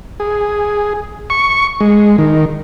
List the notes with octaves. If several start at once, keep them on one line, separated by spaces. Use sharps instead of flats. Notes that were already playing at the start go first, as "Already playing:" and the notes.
G#4
C#6
G#3
D#3